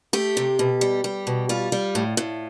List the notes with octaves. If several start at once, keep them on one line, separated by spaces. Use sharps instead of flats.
A3 G4
C3
B2
G3
G3
B2
G3 F4
G3
A2
A2